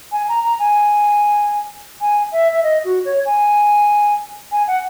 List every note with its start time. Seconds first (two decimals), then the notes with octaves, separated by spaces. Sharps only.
0.12 G#5
0.29 A#5
0.44 A#5
0.59 G#5
2.01 G#5
2.32 E5
2.52 E5
2.63 D#5
2.85 F#4
3.05 C#5
3.26 G#5
4.52 G#5
4.68 F#5